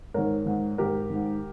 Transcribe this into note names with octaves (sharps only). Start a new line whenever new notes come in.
G#2 D#3 A#4 C#5
G#2 D#3
G#2 D#3 G4 A#4
G#2 D#3